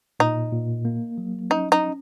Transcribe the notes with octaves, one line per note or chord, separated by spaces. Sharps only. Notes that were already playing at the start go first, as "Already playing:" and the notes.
A#2 D#4
A#2
A#3
F#3
C#4 D#4
D#4
C#4